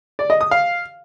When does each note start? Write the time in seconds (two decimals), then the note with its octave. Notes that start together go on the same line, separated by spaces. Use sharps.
0.19 D5
0.30 D#5
0.41 D#6
0.51 F5